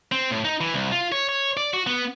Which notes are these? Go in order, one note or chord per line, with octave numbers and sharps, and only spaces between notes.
C4
A2
D#4
E3
C2
F4
C#5
C#5
D5
F#4
B3